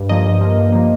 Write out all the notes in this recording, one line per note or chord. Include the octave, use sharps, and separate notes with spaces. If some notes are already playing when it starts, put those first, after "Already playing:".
Already playing: G2
F3 A#3 D#5
G2
F3 A#3
G2
F3 A#3